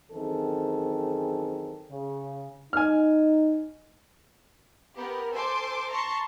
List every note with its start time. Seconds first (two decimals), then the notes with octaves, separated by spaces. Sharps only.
0.11 F#2 D#3 E3 C4 G#4 A4
1.90 C#3
2.73 D#4 G#5 F6
4.97 B3 G4 A#4
5.33 A4 C5 G#5 C6 D6
5.90 A5 A#5 C6 C#6